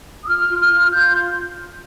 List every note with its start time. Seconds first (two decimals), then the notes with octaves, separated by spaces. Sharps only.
0.23 D#6
0.27 F4 F6
0.48 F4
0.60 F6
0.69 F4
0.91 F4 G6